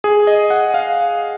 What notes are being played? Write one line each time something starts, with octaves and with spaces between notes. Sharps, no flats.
G#4
D#5
F#5
F5